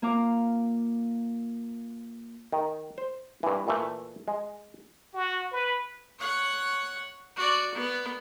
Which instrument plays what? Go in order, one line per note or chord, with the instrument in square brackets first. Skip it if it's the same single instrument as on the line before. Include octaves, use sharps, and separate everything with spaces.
[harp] A#3 F4 F5 A#5 D6
[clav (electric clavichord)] D#3
C5
G2 E3
A#2 E3 A3
G#3
[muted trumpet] F#4
B4
[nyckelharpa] C#5 F#5
F#4 D5
B3